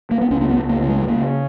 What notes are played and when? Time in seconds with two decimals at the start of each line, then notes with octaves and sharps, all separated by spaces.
0.11 A#3
0.21 B3
0.31 C#2 C#4
0.41 A#3
0.50 B3
0.57 C#2
0.69 A#3
0.82 C#3
0.89 G#3
1.02 G#3
1.08 C#3 A#3